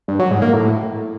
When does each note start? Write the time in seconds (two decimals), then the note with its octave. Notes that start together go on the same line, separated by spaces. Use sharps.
0.08 G2
0.19 F#3
0.31 G#2
0.42 A#3
0.53 A2